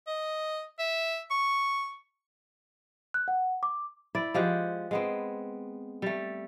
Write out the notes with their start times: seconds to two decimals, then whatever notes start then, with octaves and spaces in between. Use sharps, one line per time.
0.07 D#5
0.79 E5
1.31 C#6
3.14 F#6
3.28 F#5
3.63 D6
4.15 E4 D5
4.34 F3 G#3 G4 F#5
4.91 G#3 B3 C4
6.02 G3 A3